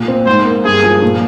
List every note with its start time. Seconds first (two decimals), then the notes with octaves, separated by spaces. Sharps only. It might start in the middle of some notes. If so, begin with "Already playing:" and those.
Already playing: A#2
0.08 C4
0.26 G#2 C5
0.45 A#3
0.64 G2 G#4
0.83 F3
1.02 A#2